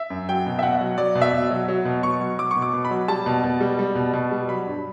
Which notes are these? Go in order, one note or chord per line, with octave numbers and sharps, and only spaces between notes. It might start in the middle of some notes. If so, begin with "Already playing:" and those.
Already playing: E5
F#2
F#3 G5
B2
E5
B2 F#5
F#3
F#3 D5
B2
E5
B2
F#3
F#3
B2
B2 C#6
F#3
F#3 D6
C#6
B2
D6
B2
B5
F#3
G3 A5
B2
B2
G3
G3
B2
B2
G3
F#3 B5
G2